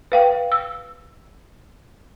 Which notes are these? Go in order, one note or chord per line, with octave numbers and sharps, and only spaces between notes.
B4 F5 G5
E6